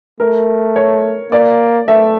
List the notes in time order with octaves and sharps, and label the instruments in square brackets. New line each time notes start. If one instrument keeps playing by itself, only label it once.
[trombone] A3 [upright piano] A#4
[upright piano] C#5
[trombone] A#3 [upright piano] D5
[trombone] A3 [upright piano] E5